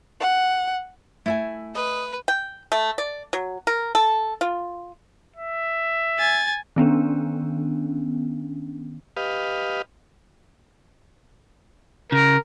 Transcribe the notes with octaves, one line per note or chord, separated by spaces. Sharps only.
F#5
A3 E4 E5 G#5
B4 D#5
G5
A3
D5
F#3
A#4
A4
F4
E5
G#5 A6
D#3 B3 C#4 D4
G4 B4 D#5 F5
C#3 A#4